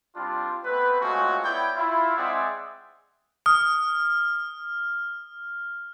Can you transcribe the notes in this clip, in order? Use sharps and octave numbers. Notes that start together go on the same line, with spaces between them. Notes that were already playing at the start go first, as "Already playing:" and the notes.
G3 C4 D4 F4
A3 B3 C4 B4
G#3 A3 C4 C#4 F4 F#4
B3 E4 C#5 D5 G5
E4 F4
G#3 C4 G#4 D5 E5 F#5
D#6 F6